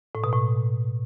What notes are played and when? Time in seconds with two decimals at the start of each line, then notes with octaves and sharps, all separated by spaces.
0.15 A2
0.24 B2
0.33 A2